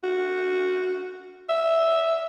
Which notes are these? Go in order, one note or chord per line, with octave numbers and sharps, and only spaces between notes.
F#4
E5